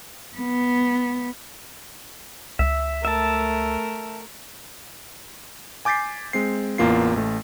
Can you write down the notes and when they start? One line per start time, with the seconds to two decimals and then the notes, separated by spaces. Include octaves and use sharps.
0.38 B3
2.59 C#2 E5
3.05 A3 A#4 E5 A5
5.85 G#5 D6 G6 A6 B6 C7
6.33 G#3 C4 C7
6.78 A1 E2 A#3 F4 C7
7.16 A1 A3